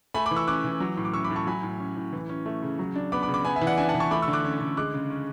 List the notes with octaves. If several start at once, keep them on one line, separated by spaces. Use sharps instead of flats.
A3 G#5 B5
B5 D6
E3
C#6 E6
C#4 D6 F#6
E3
F#3
A2
D6
C#4 C#6 E6
B5 D6
A2
A5 C#6
F#3 G#5 B5
A2
C#4
A2
E3
C#4
A3
C#3
F#3
D4
B3 B5 D6
B5 D6
C#3
B5 D6
B3 G#5 B5
E5 G#5
E3
D5 F#5
D4 E5 G#5
F#5 A5
E3
A5 C#6
A3 B5 D6
C#6 E6
D3
D6 F#6
C#4
D3
G#3 D6 F#6
C#3
C#4